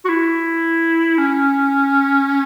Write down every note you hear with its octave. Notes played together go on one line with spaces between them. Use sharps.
F#4
E4
C#4